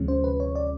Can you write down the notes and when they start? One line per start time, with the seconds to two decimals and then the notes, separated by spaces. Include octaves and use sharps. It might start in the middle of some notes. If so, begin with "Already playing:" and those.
Already playing: D2 C3 F3 G#3 C#4
0.08 C5
0.24 B4
0.40 C#5
0.55 D5